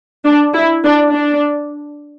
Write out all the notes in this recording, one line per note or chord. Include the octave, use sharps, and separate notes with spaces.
D4
E4
D4
D4